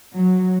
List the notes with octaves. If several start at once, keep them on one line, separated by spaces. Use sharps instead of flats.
F#3